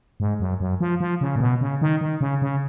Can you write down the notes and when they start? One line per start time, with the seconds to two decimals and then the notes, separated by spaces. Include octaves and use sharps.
0.20 G#2
0.40 F#2
0.60 F#2
0.81 F3
1.00 F3
1.21 C#3
1.36 A#2
1.40 B2
1.61 C#3
1.82 D#3
2.01 D#3
2.21 C#3
2.42 C#3